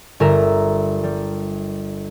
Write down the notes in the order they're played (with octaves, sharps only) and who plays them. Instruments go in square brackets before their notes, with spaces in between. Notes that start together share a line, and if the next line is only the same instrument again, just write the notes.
[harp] G1 A#4 E5 A#5
G3